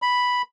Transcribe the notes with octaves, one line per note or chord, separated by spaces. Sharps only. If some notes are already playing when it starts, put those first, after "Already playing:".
B5